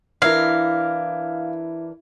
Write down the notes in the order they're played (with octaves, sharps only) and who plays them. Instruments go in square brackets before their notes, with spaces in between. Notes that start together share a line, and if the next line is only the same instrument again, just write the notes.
[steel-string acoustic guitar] E3 D4 A#4 [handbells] E4 E5 G#6 [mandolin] F5